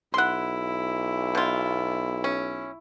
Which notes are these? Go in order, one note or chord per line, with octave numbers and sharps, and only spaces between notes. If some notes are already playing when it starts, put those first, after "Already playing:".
B1 E4 F#5 C6
B2 F4
C#4